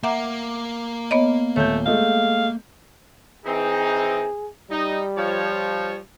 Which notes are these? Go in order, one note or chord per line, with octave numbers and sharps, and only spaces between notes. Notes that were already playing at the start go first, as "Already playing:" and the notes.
A#3 E5 F#5 A#5 D6
B3 C#5 D#5
D#1 A3 C#5 G6
G#3 A3 D#5 F5
E3 C4 D#4 G#4
G3 D#4
F3 C#5